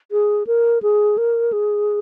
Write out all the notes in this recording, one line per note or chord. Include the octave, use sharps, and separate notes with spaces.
G#4
A#4
G#4
A#4
G#4